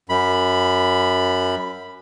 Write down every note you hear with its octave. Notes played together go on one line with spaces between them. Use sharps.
F#2 B5